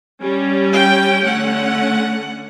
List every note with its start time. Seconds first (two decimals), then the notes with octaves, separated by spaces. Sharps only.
0.21 G3 C#4
0.73 G5
1.23 D3 A3 C#4 F#5